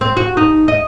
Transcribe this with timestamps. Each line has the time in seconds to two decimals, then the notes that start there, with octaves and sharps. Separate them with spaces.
0.01 C4
0.17 F#4
0.37 D#4
0.68 D#5